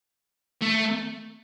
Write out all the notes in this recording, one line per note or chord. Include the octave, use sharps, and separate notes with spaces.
A3